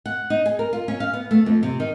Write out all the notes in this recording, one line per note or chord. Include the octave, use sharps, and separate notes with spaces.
F#5
D#4
G#4
A#4
F4
C#4
F5
B3
A3
F2
C3
D#3